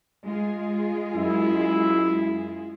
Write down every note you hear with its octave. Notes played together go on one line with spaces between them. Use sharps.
G#3 F4 G#4
F#2 E4